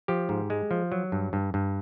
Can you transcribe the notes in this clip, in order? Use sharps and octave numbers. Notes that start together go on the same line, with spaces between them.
F3 G4
G#2
G#3
F3
F#3
G2
G2
G2